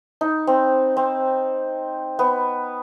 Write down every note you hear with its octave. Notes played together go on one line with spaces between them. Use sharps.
D#4
C4
C4
B3